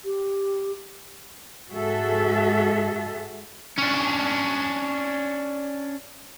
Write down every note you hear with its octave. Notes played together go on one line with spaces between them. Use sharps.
G4
G#2 F#4 G#4 A4 E5
C#4 D4